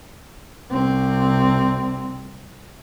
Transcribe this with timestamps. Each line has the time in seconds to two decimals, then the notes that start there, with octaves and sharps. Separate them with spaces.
0.71 C2 C4